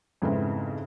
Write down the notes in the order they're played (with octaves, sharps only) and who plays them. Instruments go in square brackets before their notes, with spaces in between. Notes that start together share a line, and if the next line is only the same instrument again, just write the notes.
[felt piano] F2 G#2 C#3 E3 B3 C4